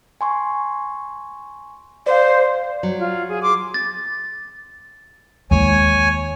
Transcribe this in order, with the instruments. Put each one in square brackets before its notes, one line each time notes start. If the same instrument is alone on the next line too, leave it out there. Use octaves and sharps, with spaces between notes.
[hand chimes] G#5 C6 C#6
[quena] C5 [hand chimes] D5 F5
[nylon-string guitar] F#3
[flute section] F4
G#4
C6 D6
[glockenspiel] A6
[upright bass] D#2 G#3 [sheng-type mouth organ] C#5 G#5